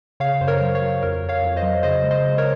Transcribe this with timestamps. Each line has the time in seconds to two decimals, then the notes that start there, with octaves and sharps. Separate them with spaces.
0.20 C#3 C#5 F5
0.41 F#2 C5
0.48 A#4 C#5
0.61 F#3
0.75 C#5 F5
0.82 F#3
1.02 F2 A#4 C#5
1.23 F2
1.29 C#5 F5
1.42 F2
1.56 C5 D#5
1.63 F#3
1.83 C#3 C5 D#5
2.04 G#3
2.11 C5 D#5
2.24 C#3
2.38 A#4 C#5